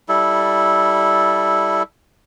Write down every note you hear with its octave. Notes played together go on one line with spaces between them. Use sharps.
G3 E4 A4